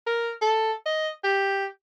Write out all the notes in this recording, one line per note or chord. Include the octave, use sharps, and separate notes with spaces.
A#4
A4
D#5
G4